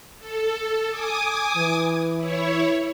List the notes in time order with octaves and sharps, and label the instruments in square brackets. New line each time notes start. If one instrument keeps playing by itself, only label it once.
[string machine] A4
G#5 D6 D#6
[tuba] E3
[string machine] E4 C#5